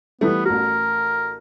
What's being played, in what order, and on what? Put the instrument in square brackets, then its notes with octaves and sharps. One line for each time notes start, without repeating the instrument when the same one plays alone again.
[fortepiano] E3 G3 A3 [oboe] B3
[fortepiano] A1 F#4 [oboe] A#4